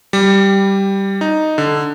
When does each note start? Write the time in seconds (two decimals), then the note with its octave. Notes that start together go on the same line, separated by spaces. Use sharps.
0.13 G3
1.21 D#4
1.58 D3